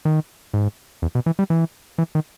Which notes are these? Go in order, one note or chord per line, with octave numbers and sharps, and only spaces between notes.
D#3
G#2
E2
B2
E3
G3
E3
E3
D#3